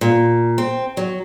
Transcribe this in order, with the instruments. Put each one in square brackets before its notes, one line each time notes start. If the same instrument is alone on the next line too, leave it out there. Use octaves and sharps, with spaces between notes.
[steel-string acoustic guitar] A#2
C4
F#3